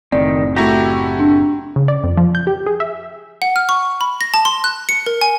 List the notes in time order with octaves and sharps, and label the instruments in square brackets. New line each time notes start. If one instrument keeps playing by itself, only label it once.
[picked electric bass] F#1 A2 C4 [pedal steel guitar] D#3 [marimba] D5
[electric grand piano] A3 E4 F#4 [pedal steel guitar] G4 A#5
[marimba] D4
[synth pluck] C#3
D5
F2
F3
G6
G4
G#4
E5
[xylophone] F#5
F6
C#6
B5
A#6
A5
C6
F#6
C#7
A#4
G#5